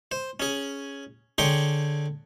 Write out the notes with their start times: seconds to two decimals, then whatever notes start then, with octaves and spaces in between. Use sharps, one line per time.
0.11 C5
0.40 C#4 G#4
1.38 D3 G#4 C#5 G5 C6